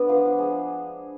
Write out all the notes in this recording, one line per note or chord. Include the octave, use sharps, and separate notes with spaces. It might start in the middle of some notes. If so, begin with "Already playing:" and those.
Already playing: B3 D4
F3
G#3